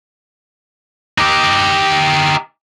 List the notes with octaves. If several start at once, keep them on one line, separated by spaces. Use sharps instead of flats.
D#4 G4